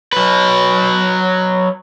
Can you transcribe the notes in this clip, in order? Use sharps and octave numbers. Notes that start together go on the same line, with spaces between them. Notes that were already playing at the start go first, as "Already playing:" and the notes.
F#3 B4